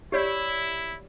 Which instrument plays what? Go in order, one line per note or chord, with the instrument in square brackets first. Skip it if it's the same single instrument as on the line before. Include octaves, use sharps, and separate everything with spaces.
[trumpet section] E4 [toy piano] G4 C#5 D5